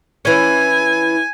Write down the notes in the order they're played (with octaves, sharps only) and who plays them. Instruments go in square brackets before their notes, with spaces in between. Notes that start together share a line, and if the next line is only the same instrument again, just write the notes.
[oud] E3 C#4 [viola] G#5